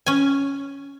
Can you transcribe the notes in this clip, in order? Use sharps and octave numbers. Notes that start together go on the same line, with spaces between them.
C#4 G#5